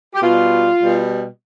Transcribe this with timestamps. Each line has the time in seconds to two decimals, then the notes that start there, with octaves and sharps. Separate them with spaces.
0.15 G4
0.22 B2 G3 F4
0.80 B2 G3